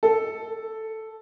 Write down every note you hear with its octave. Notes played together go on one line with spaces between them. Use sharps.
A4